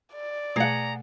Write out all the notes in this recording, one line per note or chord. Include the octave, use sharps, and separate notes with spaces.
D5
B2 A3 G#4 F#5 A#5